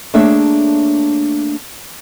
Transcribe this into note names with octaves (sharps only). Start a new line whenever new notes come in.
A3 A#3 D4 G#4 C#5 E5